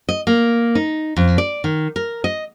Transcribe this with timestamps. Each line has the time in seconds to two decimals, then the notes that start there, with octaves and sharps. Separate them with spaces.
0.09 D#5
0.27 A#3
0.75 D#4
1.16 F2
1.38 D5
1.64 D#3
1.96 A#4
2.24 D#5